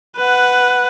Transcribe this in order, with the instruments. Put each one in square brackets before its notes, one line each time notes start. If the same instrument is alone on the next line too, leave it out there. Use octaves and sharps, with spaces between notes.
[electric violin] B4 F#5